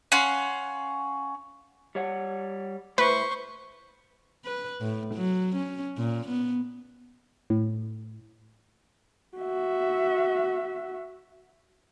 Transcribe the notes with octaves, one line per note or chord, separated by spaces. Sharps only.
C#4 F5 F#5 C6
G3 C#5 F#5
A2 B4 C5 C#6
B4
A2
F#3
C#4
A#2
B3
A2
F#4 E5